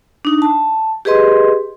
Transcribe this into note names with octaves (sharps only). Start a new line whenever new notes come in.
D4 D#4
A5
G4 G#4 B4 D#5 C6